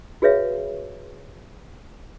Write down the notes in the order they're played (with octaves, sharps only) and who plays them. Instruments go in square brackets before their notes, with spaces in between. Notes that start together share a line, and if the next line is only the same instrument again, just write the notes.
[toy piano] F#4 G#4 B4 C#5 E5 F5